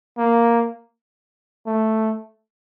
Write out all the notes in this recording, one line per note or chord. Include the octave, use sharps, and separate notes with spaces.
A#3
A3